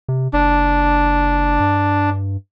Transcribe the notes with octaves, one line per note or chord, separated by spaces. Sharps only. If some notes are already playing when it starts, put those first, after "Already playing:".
C3
F#1 D4
G2